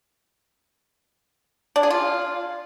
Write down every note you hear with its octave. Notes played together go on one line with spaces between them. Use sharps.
D4
G#4
F4